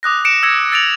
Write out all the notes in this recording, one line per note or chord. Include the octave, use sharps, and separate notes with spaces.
D6 D#6 F#6 A#6
C#7 D7 E7
E6 G#6 A#6 C#7 D7
E6 A6 C#7 D7 F7 F#7